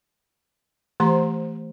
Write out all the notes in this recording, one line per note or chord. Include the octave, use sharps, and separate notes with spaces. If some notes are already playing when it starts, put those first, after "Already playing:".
E3 A3 G4 C5 A#5 C6